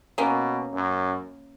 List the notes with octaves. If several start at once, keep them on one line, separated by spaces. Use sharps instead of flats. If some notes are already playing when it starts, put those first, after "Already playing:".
B2 A#3 C#4
F#2